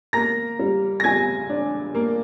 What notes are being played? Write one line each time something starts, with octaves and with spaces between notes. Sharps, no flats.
A#3 A#5 A#6
G3
A#6
G3 G#5 G#6
D4
A#3